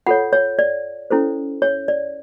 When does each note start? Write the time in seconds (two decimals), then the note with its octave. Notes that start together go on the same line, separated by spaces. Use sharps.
0.07 F4 A4 C#5 F#5
0.33 C#5
0.59 D5
1.10 C#4 E4 A4 C5
1.62 C#5
1.88 D5